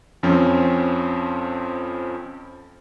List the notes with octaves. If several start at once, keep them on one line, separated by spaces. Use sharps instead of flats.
F2 F3 C4 C#4